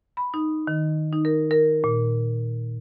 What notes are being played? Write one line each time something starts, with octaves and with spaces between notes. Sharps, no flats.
B5
D#4
D#3
D#4
A#4
A#4
A#2